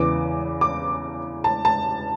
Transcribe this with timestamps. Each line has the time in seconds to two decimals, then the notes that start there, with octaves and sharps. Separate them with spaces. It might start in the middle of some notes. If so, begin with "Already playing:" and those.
Already playing: E2 C#3 E3 D6
0.61 D6
1.44 A5
1.65 A5